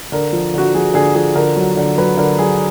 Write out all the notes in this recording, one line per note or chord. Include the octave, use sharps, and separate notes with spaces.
D3 A#4
F3
D3 F#4
F3 G#4
D3 G#4
F3 G#4
D3 A#4
F#3
D3
F#3 B4
D3 A#4
F#3 G#4